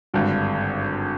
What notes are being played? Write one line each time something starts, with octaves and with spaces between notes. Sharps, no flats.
G#1 G2 D3